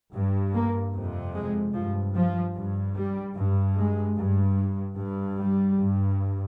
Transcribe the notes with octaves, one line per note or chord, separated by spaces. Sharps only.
G2
A#3
F2 C3
G#3
G2 F3
F3
G2
G3
G2
G#3
G2
G2
G3
G2